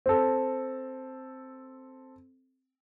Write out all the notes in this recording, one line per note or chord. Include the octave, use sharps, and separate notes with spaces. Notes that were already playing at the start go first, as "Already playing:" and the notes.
C4 A4